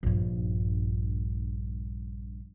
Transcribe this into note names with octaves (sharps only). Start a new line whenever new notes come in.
A#1 G2